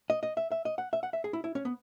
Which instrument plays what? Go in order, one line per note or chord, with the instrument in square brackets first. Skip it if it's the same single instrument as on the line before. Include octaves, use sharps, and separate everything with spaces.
[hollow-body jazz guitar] D#5
D#5
E5
E5
D#5
F#5
E5
F#5
E5
G#4
E4
E4
C#4
B3